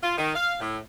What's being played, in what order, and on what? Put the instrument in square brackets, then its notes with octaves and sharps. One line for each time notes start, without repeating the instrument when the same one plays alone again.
[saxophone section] F4
D#3
F5
A2